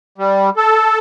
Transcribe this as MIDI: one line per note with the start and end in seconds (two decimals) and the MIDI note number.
0.18 0.50 55
0.57 0.99 69